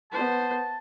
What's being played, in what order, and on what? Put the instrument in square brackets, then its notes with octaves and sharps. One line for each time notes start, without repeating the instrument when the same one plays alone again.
[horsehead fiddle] B3 C5 [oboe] A5